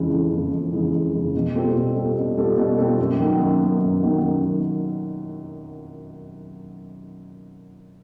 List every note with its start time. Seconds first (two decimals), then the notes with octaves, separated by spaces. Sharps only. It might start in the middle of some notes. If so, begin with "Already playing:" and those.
Already playing: F2 C#3 E3 G#3
0.11 F2
0.32 C#3 E3 G#3
0.52 F2
0.73 C#3 E3 G#3
0.93 F2
1.13 C#3 E3 G#3
1.35 B2
1.55 G3 C4 F4 A4
1.75 B2
1.96 G3 C4 F4 A4
2.17 B2
2.37 G3 C4 F4 A4
2.58 B2
2.78 G3 C4 F4 A4
2.99 F#2
3.19 D#3 F#3 B3
3.39 F#2
3.60 D#3 F#3 B3
3.81 F#2
4.02 D#3 F#3 B3
4.22 F#2
4.42 D#3 F#3 B3